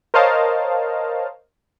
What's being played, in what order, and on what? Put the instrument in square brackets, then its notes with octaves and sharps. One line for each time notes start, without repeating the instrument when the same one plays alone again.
[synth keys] A#4 C5 C#5 D#5 F5 A5